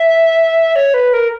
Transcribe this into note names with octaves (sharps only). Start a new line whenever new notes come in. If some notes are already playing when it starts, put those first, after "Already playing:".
Already playing: E5
C#5
B4
A#4